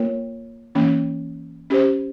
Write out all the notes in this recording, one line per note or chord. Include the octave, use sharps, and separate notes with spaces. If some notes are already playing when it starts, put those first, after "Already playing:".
Already playing: A#3 F4 A#4 C#5
E3 A#3 C#4
C#4 G4 C5